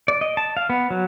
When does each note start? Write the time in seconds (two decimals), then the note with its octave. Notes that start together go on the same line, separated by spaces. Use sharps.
0.08 D5
0.21 D#5
0.37 A5
0.57 F5
0.70 B3
0.90 F#3